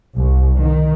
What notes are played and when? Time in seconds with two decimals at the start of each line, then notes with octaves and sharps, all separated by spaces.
0.15 C2
0.59 D#3